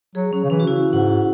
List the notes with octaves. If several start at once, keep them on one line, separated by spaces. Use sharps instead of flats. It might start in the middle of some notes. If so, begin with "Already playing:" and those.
F#3 G#4
F#3 C#4
C#3
E3 C#4
F#4
C#3 E4
G#2 F#5